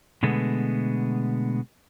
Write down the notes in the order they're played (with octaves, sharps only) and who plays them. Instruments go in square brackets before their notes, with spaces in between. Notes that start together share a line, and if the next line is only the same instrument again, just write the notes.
[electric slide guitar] B2 D3 G#3 A3 B3